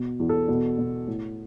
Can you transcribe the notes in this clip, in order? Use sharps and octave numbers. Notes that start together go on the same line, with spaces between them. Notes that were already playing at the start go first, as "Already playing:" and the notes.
Already playing: B2
E2
A4
B2
B2
A2